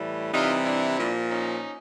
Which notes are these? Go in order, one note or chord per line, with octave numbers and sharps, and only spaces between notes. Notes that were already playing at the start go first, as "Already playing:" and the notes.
Already playing: A2 E3 G3
C3 E3 G3 D#4 F4
D4 E4
A#2 F3
C#4 D#4